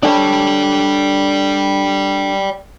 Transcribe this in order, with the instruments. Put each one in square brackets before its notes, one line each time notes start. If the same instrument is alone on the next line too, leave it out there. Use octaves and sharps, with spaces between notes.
[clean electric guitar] D4 A4 C#5 [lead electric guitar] D5 G5